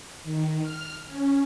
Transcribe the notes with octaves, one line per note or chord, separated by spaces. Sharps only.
D#3
F6
C#4